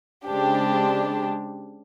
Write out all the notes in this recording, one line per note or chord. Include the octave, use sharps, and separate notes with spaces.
C#3 G#3 C4 D4 G4